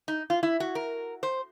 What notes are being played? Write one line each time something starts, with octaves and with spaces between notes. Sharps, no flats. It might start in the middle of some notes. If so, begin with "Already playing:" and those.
D#4
F4
E4
F#4
A#4
C5